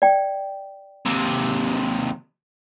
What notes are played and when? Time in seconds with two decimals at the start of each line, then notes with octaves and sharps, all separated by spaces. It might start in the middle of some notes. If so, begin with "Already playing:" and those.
0.02 D5 G5
1.06 D#2 C3